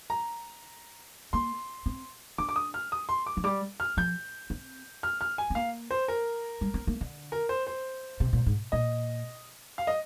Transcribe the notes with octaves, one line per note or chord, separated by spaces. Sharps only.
A#5
A#3 C6
C4
D4 D6
D6
D#6
F6
D#6
C6
D6
F3
G3 D6
F6
F3 G6
C4
F6
F6
G#5
C4
A#3 F5
C5
A#4
G3
C4
A#3
D3
A#4
C5
C5
C3
A#2
G#2
A#2 D#5
F5
D#5